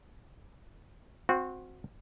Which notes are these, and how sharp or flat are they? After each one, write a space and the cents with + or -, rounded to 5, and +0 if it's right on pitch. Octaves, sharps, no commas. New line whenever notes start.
C4 +0 F#4 -20